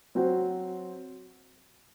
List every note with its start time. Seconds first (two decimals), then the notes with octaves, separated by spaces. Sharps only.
0.15 F#3 C4 F#4 C5